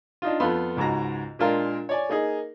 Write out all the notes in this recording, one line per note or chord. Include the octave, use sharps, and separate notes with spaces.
D4 D#4 F4
F2 B3 F4 A4 B5 C6
C#2 G#2 G#3 F#4 A#5
A#2 G#3 D4 F4 A#4
C#5 D5 G#5
A#3 D#4 G#4